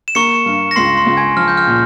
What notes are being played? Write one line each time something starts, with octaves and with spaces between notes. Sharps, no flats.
E7
A#3 C#6 C#7
G2
A#6
C#2 C6 C7
C6 C7
C#2
G#5 G#6
F3 F6
G6
F6
A#2